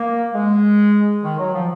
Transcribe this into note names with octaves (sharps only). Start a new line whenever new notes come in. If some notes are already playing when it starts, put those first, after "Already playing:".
Already playing: A#3
G#3
D#3
F#3
F3